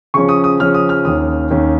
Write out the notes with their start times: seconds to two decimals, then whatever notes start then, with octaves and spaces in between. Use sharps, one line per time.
0.14 C#3 F3 C#4 C#6
0.29 D#6
0.44 D#6
0.60 C#3 F3 C#4 F6
0.74 D#6
0.89 F6
1.05 D#2 D#3 C#4 D#6
1.50 D#2 D#3 C#4